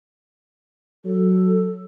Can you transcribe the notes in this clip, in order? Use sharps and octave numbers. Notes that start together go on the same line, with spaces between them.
F#3 A4